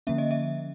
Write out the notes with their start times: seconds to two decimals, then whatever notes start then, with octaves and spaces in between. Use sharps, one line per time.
0.07 D3 F3 A#3 C#4 E5
0.18 D#5
0.31 E5